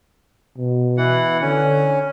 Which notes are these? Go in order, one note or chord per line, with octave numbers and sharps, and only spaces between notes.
B2
E3 F#5
D3 C#4